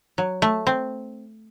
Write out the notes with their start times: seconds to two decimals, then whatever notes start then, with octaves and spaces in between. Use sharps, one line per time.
0.18 F#3
0.42 A3
0.67 C4